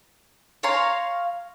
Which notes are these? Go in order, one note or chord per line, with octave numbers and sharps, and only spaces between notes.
C#5 F5 A#5 C6